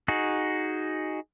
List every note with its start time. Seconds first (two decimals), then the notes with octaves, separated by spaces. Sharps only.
0.08 D#4 F#4 G#4